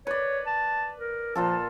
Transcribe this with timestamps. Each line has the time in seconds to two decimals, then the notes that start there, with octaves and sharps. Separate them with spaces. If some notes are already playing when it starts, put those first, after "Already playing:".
0.07 B4 C#5 D5
0.46 A5
0.99 A#4
1.35 A#2 F3 F4 A4